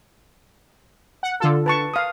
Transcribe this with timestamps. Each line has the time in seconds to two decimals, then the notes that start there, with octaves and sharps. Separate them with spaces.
1.23 F#5
1.40 D3 F4 A4
1.66 B4 A5 C#6
1.94 F5 D#6